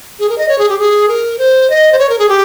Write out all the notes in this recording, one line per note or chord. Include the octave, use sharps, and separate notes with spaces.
G#4
A#4
D#5
C#5
G#4
G4
G#4
A#4
C5
D#5
C5
C#5
A#4
G#4
G4